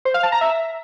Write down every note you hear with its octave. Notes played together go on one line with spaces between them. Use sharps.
C5
F5
A5
A#5
E5